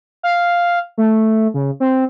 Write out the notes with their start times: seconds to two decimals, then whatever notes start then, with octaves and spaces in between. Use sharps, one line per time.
0.23 F5
0.98 A3
1.54 C#3
1.80 C4